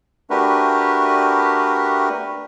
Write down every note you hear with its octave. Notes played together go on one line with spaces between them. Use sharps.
A3 D4 F#4 G4 A#4 B4